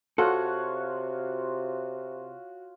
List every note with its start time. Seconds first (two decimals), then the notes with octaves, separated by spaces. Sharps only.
0.18 C3 F4 F#4 A4 C#5 F#5